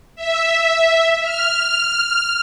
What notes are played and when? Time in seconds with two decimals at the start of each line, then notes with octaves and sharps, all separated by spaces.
0.15 E5
1.22 F6